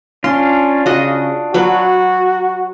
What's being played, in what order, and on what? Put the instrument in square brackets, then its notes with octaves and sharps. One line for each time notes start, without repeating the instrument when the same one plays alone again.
[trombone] C#4 [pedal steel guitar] D4 F4 [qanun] C6
[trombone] C#3 [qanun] F#4 D#5
[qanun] F#3 B4 [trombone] F#4